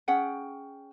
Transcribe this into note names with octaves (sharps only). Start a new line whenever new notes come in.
C#4 G#4 F#5 G5